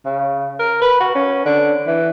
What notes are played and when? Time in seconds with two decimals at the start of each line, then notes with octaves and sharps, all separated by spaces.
0.05 C#3
0.59 A#4
0.81 B4
1.00 F#4
1.15 C#4
1.45 D3
1.87 E3